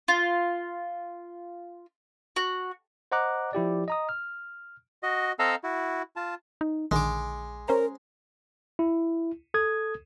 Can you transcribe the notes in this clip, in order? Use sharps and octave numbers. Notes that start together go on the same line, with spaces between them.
F4
F#4
C5 D#5 F#5 A#5 D6 F#6
F3 E4 G4 D5
D#5 A#5 D#6
F6
F#4 D#5
C4 A4 D#5 F5 A#5 E6
E4 F#4
F4 A5
D#4
A#1 D3 D#3 G#3 D6
C#4 A#4 C5 A#5
E4
A4 D#6 G#6